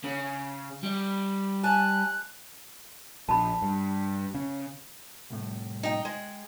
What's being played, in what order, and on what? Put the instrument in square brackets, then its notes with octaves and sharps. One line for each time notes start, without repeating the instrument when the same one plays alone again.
[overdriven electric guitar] C#3
G3
[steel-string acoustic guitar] G#5 A5 [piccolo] F#6
[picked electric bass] A#1 [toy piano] A5 B5
[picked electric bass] G2
C#3
[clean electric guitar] C2 A2
[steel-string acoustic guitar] D#4 G5
G#3